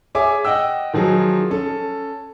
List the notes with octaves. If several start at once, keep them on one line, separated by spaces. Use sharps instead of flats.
G#4 C#5 E5 G#5 D6
D#5 F#5 G5 E6
D#3 F3 F#3 G#4
C#4 A4